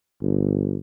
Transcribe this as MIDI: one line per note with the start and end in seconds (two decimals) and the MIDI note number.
0.22 0.77 31